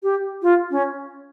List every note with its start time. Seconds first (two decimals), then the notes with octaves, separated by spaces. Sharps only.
0.03 G4
0.42 F4
0.71 C#4